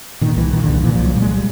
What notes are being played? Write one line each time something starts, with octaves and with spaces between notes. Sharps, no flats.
A#2 D#3
C2 E3
A#2 D#3
D3
C2
D#3
A#2 E3
F3
C2
F#3
A#2 G3
G#3
G3